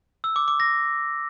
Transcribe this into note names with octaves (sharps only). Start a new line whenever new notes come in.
E6
D6
D6
A#6